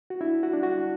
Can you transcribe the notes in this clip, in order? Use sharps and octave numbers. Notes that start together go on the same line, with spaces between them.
F#4
D4 E4
F#4
D4
F#4